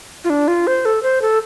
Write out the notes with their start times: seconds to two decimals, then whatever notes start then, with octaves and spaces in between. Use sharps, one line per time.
0.24 F4
0.30 D4
0.48 F4
0.67 C5
0.85 A4
1.03 C5
1.22 A4